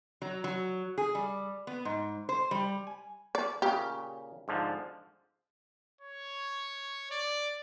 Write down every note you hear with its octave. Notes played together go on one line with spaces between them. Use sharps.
F#3
F#3
G#4
G3
B3
G#2
C5
G3
G#5
D5
A#2 C#3 G4
G#2 D3 F3
C#5
D5